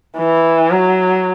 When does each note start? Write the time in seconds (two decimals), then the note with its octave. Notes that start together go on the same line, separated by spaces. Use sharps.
0.18 E3
0.71 F#3